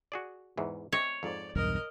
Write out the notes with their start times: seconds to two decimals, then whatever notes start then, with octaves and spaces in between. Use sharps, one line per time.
0.12 F#4 G#4 D5
0.58 E2 G#2 E3
0.92 C4 C#5 D#5 E5
1.23 F2 G#2 D5
1.56 B1 E2 G2 A#4 D#5